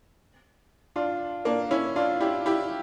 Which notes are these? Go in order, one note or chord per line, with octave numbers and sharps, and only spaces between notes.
D4 F4
A#3 D4
C#4 E4
D4 F4
E4 G4
E4 G4